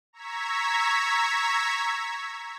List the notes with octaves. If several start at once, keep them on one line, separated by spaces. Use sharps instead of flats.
A#5 C#6 E6 G#6 B6